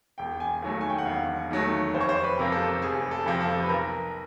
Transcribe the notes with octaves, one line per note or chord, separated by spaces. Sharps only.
E1 G5
G#5
D#2 D#3 F#3 A3
G#5
G5
F#5
E1 F5
D#2 D#3 F#3 A3
F1 C5
C#5
C5
B4
F2 C3 F3 A#4
A4
F1 G#4
A4
F2 C3 F3
A4
B4
B1 A#4